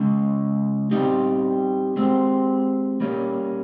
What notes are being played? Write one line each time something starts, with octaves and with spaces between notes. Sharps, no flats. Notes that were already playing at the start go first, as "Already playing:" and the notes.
Already playing: C#3 G#3 C#4
G3 C4 D#4 G4
G#3 C4 G4
G3 A#3 C#4